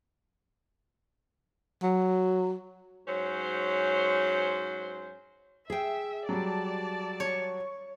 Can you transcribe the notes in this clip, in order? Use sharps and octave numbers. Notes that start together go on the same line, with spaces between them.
F#3
G#2 F#3 C#4 C5
G#4 E5 G5
F#3 G3 D5 A5
C#5